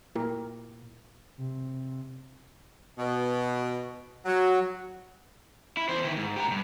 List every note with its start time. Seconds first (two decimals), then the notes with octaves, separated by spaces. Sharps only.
0.15 A#2 E4 G4 A#4
1.38 C3
2.98 B2
4.26 F#3
5.77 E4
5.89 E2 C5
6.04 D#3 E4
6.16 G#2
6.36 G4 A#5
6.48 G2 B2